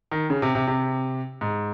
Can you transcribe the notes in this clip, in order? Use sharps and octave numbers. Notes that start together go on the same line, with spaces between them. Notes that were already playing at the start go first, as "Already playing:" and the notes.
D#3
C#3
C3
C3
C3
G#2